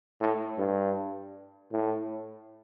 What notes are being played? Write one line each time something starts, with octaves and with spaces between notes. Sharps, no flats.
A2
G2
A2